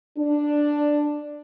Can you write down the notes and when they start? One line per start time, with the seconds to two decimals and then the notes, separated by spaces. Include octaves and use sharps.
0.18 D4